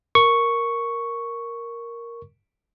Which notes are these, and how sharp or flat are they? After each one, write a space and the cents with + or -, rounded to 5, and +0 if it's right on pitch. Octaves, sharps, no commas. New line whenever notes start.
A#4 +0 C#6 +0